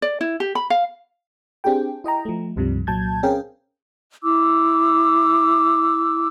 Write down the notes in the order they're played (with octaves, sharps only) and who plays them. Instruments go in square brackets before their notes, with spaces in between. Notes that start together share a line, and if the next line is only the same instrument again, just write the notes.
[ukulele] D5
E4
G4
B5
F5
[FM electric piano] C4 D4 G4 G#4 G5
E4 D#5 G5 A#5
F3 A3
C#2 G2 C3 F3 G3
C2 A#2 F#3 A5 G6 G#6
C4 C#4 G#4 A#4 F5 G5
[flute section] E4 D6 E6